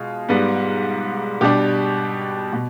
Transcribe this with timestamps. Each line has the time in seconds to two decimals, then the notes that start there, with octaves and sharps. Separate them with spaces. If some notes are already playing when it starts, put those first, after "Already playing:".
Already playing: B2 G#3 F4
0.29 G#2 G3 B3
1.41 B2 G3 D4 G4
2.53 B2